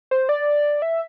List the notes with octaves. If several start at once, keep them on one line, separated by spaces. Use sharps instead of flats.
C5
D5
E5